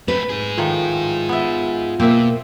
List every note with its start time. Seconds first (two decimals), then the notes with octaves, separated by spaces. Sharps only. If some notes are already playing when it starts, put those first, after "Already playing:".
0.08 A3 C4 B4
0.29 D#4 G#4
0.58 A2 D#3 F3 F4
1.29 B3 E5
2.00 B2 A#3 C4 E5